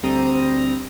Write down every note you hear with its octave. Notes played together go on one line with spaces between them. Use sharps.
D2 G3 C4 A#5 D#6